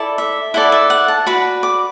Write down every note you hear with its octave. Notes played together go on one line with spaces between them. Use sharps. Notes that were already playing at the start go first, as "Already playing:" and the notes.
Already playing: E4 A4 D5
E5
E4 A4 D5 F#5
E5
F#5
A5
F#4 B4 D5 B5
D6